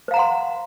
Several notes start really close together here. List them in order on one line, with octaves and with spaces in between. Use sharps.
C5 F5 A#5 F#5 C6